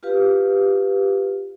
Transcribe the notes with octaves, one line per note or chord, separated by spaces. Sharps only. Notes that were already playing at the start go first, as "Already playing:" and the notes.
F4 G4 B4 F5